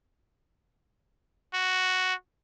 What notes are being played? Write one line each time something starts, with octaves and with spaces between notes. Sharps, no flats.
F#4